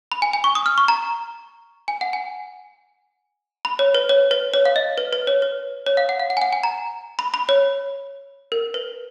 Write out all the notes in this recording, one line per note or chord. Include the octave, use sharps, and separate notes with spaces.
B5
G#5
G#5
C#6
D#6
F6
C#6
A#5
G#5
F#5
G#5
B5
C#5
B4
C#5
B4
C#5
F5
D#5
B4
B4
C#5
B4
C#5
F5
F#5
F5
F#5
G#5
F#5
G#5
A#5
B5
B5
C#5
A#4
B4